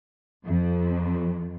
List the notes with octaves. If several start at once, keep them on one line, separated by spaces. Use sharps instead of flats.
F2